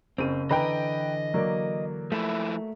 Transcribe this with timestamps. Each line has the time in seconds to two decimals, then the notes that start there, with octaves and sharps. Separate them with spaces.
0.18 F#1 C#3 C4 D#7
0.51 D3 E3 B4 D#5 G5 A#5
1.34 F#3 A#3 D5
2.12 F3 A3 E4